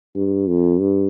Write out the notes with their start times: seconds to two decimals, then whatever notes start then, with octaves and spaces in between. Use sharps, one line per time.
0.15 G2
0.47 F2
0.80 G2